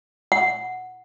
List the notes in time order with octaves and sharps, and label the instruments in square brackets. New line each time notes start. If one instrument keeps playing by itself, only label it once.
[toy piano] F#5